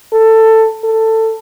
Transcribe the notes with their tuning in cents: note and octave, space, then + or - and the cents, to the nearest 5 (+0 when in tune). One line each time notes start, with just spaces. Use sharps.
A4 +15
A4 +15